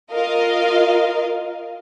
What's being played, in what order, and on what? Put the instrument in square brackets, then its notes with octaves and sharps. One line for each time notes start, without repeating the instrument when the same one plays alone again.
[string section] F4 A#4 D#5 F5